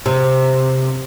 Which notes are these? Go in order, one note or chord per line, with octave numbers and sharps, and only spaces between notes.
C3